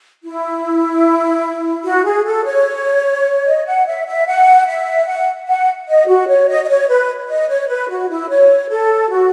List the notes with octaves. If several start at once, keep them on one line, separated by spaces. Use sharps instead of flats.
E4
F#4
G#4
A4
C#5
D#5
F#5
E5
E5
F#5
E5
F#5
F#5
D#5
F#4
C#5
D#5
D#5
C#5
B4
D#5
C#5
B4
F#4
E4
C#5
A4
F#4